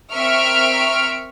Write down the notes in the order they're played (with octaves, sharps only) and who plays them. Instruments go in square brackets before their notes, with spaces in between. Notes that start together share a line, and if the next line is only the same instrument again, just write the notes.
[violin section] C4 A#4 E5 C#6 F6 D7